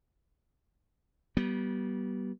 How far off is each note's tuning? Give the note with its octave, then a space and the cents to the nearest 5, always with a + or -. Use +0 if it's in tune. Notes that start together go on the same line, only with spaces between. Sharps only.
G3 -30 B3 -30